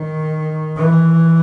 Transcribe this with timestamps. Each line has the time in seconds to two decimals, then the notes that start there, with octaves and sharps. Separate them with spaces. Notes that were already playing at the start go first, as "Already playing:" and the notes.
Already playing: D#3
0.77 E3